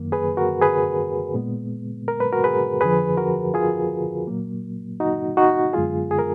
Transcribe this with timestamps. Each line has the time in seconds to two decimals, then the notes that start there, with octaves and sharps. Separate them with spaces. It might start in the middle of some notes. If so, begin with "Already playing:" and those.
Already playing: F#2 D#3 A#3
0.12 G#4 B4
0.37 F#4 A#4
0.61 G#4 B4
1.34 A#2 G#3 B3
2.08 A#4
2.20 B4
2.33 F#4 A#4
2.44 G#4 B4
2.81 F2 D3 F3 G#4 B4
3.17 F#4 A#4
3.54 F4 G#4
4.27 A#2 F#3 A#3
5.00 D#4 F#4
5.37 D#4 F#4
5.73 F#2 D3 G#3 B3 F4 G#4
6.11 G#4
6.19 A#4